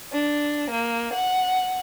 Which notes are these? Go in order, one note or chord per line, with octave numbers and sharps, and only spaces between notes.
D4
A#3
F#5